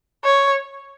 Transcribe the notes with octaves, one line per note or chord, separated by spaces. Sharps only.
C#5